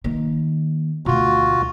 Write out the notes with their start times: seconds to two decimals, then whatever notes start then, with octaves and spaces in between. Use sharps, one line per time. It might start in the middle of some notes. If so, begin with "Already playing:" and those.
0.04 D#3 A#3
1.06 D2 B2 F4 F#4